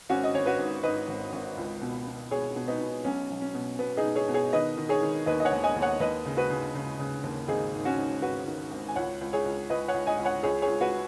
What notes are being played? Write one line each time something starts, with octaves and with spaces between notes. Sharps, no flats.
G#1 C#4 F#4
D#5
G#1 C#5
F#4 B4
G#2
G#2 B4 D#5
G#1
G#1
C#2
B2
B2
B2 G#4 C#5
B2
B3 D#4
B2
B1 C#4
B1
C#4
B2
B2 B3
D#4 G#4
B2
G#4 C#5
B2
G#4 C#5
D#3 B4 D#5
D#3
G#4 C#5
D#3
D#2 B4 D#5
D#5
C#5 F#5
D#2
D#5 G#5
D#2
C#5 F#5
D#2 B4 D#5
C#3
F#4 B4
C#3
C#3
C#3
D#2
G#1 D#4 G#4
G#2
C#4 F#4
G#2
G#1 F#4 B4
D#3
G#1
G#5
C#2 C#5 F#5
C#2
G#4 C#5
C#2
C#2 B4 D#5
C#5 F#5
C#2
D#5 G#5
C#2
C#5 F#5
C#2 G#4 C#5
G#4 C#5
C#2
F#4 B4